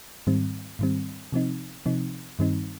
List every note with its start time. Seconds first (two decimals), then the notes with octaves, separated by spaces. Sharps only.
0.27 G#2 D#3 G3 C4
0.79 G#2 D#3 G3 C4
1.32 C3 F3 C4 D#4
1.86 C3 F3 C4 D#4
2.39 G2 D#3 G3 C4 D#4